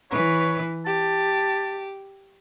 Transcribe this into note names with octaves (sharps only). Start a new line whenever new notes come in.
E3 B4 C#5
G4 A5